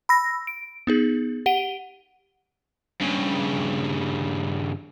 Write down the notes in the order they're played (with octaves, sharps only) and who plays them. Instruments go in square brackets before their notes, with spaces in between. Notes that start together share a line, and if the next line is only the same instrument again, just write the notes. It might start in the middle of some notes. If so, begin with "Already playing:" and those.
[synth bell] B5 E6 A#6
D7
B3 D#4 G#4
G4 F#5 D7 D#7 G7
[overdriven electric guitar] G2 C#3